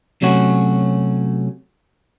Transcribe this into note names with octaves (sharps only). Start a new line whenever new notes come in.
C3 F#3 A3 C#4 F#4